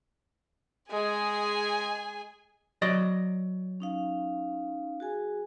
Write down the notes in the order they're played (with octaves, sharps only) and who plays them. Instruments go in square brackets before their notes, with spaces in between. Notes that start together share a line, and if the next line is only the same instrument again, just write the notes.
[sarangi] G#3 [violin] G#4 G#5
[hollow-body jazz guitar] F#3 D5 D#5
[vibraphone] C#4 D#4 F5
F#4 G#4 G#5